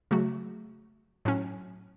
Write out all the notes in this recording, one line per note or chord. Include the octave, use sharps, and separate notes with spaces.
C#3 F#3 A3 F#4
A2 F#3 C#4